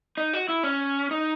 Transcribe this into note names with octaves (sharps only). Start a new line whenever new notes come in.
D#4
F#4
E4
C#4
D#4